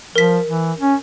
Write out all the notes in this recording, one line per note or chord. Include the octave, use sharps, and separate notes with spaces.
F3 A#4 B6
E3
C#4